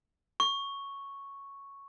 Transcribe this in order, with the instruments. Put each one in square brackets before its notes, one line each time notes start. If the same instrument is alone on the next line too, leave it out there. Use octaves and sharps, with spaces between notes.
[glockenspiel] C#6